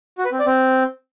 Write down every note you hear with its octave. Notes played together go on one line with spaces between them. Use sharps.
F#4
B4
C4
D5
C4